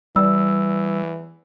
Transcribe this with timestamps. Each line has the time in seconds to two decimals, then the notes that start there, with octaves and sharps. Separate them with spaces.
0.16 E3 G3 E6